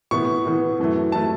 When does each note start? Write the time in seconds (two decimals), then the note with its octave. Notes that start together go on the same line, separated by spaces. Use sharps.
0.11 A2 E3 B3 C#6
0.45 A2 E3 B3
0.79 F#2 E3 A3
1.12 E3 A3 A5